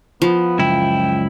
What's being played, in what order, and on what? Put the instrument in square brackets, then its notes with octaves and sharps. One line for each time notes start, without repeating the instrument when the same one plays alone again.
[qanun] F3 [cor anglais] B3
[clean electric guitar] C#2 F#2 E4 [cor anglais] G5